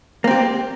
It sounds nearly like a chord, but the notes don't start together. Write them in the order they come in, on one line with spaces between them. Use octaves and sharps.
A#3 C4 G4